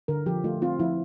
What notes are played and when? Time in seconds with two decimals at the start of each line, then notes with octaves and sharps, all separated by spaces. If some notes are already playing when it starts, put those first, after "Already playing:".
0.08 D3 A#4
0.26 F3 G4
0.44 A3 F4
0.62 C4 F4
0.79 F3 E4